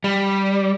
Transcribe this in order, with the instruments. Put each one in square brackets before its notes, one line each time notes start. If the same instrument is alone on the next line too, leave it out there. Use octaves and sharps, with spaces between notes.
[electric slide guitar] G3